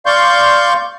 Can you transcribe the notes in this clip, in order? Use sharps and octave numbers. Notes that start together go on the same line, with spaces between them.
D5 F5 C6 C#6 G6